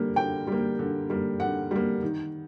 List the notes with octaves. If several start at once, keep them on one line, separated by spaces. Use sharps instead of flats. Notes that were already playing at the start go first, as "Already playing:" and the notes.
Already playing: D3 G3 A#3
D3 G5
G3 A#3
D3
G3 A#3
D3 F#5
G3 A#3
D#3